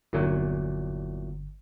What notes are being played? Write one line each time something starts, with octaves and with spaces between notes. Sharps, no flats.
G1 E2 A#2 F#3